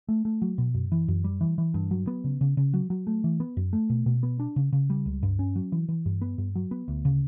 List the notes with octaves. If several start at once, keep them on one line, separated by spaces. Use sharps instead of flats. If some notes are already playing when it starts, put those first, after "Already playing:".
A3
A3
F#3
B2
F#2
E3
F#2
G3
E3
E3
G2
F#3
B3
C#3
C#3
C#3
F#3
F#3
A3
E3
B3
F#2
A3
B2
B2
B3
D4
C#3
C#3
G3
C#2
G2
C#4
F#3
E3
E3
G2
B3
G2
F#3
B3
D2
C#3